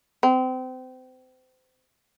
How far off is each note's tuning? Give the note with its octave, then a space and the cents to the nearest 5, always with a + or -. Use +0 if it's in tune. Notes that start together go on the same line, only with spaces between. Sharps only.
C4 -30